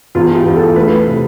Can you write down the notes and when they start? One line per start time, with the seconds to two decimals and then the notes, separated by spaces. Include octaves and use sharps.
0.15 E2 F4
0.35 G4
0.46 E2
0.56 A4
0.76 A3 B4
1.07 C3